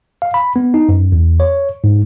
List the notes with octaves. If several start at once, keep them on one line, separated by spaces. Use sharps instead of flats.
F5
B5
B3
D#4
F#2
E2
C#5
G#2